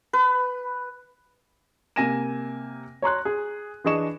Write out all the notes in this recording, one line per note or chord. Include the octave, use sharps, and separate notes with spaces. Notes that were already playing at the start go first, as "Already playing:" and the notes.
B4
C3 A#3 G#5 A#6 D#7 E7
C#5 A#5 C6 F#6
G#4
E3 D4 G#4 D#5 C#6 E7